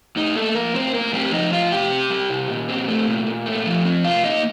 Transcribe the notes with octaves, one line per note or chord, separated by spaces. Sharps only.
A2 D#4
A3 A#3 A4
F3 A#3 A#4
A2 C4 C5
A2 A#3 A#4
G3 C4 G4
F3 D#4 D#5
A2 F4 F5
C3 G4 G5
C4
G3
C3
A#2
C4
A3
A#2
A#2
A3
F3
C4
C3 F4 F5
A#3 D#4 D#5